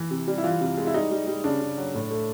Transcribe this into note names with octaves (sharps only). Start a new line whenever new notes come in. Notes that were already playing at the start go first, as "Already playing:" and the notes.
Already playing: E3
C3
G3
E4
E3 F4
C3
G#3
E4
G3 D#4
G3
G3
C#3 D4
C#3
F#3
A2
A3